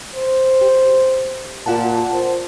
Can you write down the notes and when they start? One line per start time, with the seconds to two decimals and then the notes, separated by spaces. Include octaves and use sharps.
0.15 C5
0.61 G4
1.66 A#2 F4 F#5 A5
2.14 C5